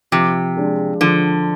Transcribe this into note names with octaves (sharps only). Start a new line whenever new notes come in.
C3 F3
G#3 D4 G#4
D3 F3